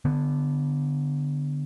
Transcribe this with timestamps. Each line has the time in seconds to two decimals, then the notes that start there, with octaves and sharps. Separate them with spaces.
0.05 D3 B3